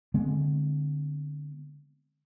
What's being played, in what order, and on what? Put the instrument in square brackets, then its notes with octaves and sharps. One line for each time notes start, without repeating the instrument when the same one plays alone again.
[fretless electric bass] D3 G#3 B3 C4